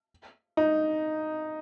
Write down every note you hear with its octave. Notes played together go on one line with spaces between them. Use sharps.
D#4